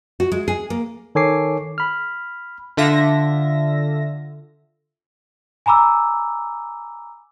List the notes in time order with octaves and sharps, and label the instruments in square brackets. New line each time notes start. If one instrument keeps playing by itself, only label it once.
[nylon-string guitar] F#4
G#3
G#4
A#3
[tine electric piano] D#3 A4 C#5 G#5 D6 C7
B5 F6
[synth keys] D3 F4 E5 A#6
[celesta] G#5 A#5 B5 D6 E6